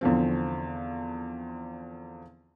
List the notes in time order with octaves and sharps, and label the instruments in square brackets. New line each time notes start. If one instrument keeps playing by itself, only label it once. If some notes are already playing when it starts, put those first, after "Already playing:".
[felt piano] E2 D3 F3 C4